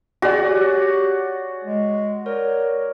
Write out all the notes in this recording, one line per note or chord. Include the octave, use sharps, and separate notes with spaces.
F#4 G#4 D5
G4 C#5
G#3
A#4 C#5 D5